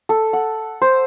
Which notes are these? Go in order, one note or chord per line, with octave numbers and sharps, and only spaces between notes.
A4
F#5
C5